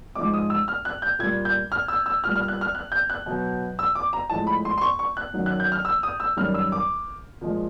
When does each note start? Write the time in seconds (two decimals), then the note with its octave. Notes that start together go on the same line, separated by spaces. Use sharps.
0.15 G#2 F3 G#3 D6
0.34 D#6
0.50 E6
0.68 F6
0.85 F#6
1.02 G6
1.19 A#2 G3 G#6
1.45 G6
1.72 F6
1.88 E6
2.06 E6
2.24 A#2 G3 F6
2.36 F6
2.48 F#6
2.61 F6
2.75 F#6
2.92 G6
3.10 F#6
3.26 B2 F#3
3.79 E6
3.95 D6
4.13 A#5
4.30 A2 F3 G#3 A5
4.47 B5
4.65 C6
4.78 C6
4.81 C#6
4.99 C#6
5.17 F#6
5.34 F#2 D#3 F#3
5.46 F#6
5.60 G6
5.72 F6
5.85 E6
6.03 D#6
6.20 E6
6.37 F#2 D#3 G3 F6
6.54 E6
6.72 D6
7.41 A#2 F3 G#3